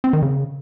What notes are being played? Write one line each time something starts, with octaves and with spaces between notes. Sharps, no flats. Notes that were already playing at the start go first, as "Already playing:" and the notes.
C4
D#3
C#3